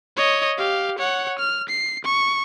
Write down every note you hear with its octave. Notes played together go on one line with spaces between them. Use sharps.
C#5 D#5
G4 F5
C#5 F#5
F6
C7
C#6